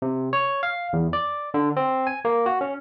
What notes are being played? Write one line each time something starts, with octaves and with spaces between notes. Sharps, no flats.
C3
C#5
F5
E2
D5
D3
C4
G#5
A#3
F#4
C#4